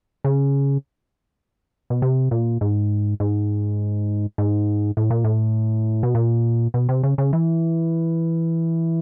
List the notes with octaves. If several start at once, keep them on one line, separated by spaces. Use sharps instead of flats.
C#3
B2
C3
A#2
G#2
G#2
G#2
A2
A#2
A2
B2
A#2
B2
C3
C#3
C#3
E3